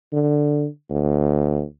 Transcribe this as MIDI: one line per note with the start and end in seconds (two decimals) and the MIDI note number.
0.13 0.67 50
0.90 1.63 38